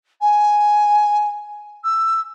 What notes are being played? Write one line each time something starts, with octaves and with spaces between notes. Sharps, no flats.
G#5
E6